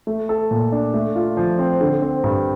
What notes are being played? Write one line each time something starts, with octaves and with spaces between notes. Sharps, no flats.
A3
A4
A#2
D4
A3
F4
F3
C4
D3
C4
G2